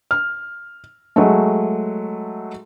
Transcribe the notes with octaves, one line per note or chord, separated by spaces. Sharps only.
F6
F#3 G#3 A3